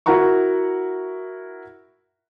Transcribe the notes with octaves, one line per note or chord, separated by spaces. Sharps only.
E4 F#4 A#4 F#5 A#5 C#6